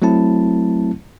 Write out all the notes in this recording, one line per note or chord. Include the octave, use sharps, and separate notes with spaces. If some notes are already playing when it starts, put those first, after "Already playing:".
F#3 A3 C4 E4 A5